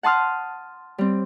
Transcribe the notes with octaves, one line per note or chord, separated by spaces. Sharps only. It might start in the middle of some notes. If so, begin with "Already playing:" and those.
F#5 A5 C6 D#6 F6
G3 C4